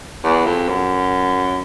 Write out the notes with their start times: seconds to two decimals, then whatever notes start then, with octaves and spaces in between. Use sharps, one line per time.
0.24 E2
0.46 F2
0.69 F#2